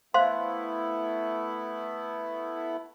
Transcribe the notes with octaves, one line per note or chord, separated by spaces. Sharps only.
A3 B3 E4 C5 F5 C6